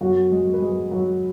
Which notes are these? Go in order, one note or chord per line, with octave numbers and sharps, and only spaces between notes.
F#2 F#3 B3 F#4
G#3 G#4
B4
G#3 G#4
F#3 F#4